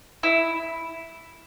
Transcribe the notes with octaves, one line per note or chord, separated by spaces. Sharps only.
E4